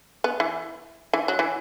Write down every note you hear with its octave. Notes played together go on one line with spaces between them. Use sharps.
B3
E3
E3
F#3
E3